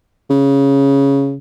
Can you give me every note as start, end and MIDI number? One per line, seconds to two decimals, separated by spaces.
0.30 1.37 49